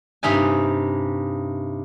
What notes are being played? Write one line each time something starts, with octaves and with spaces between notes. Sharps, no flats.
G2 C3 D#4 G5 G#5